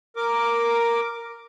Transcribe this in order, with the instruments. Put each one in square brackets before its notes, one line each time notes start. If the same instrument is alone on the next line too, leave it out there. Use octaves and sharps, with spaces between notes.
[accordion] A#4 D6